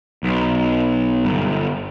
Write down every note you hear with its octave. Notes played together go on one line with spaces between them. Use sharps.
B1
G1